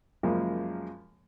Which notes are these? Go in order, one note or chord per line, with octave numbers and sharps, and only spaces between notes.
F#2 C#3 F3 G#3 A#3